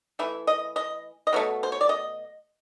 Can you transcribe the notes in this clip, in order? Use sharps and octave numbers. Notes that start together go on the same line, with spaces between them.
E3 A3 E5
D#5
D#5
D#5
B2 F#3 A3
C5
C#5
D5
D#5